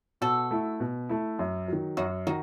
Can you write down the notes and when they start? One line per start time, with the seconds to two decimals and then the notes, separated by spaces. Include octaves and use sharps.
0.21 B2 F#4 A4
0.51 A3 E4
0.80 B2
1.09 A3 E4
1.39 F#2
1.68 D#3 F#3
1.97 F#2 D#4 F#4
2.27 D#3 D#4 F#4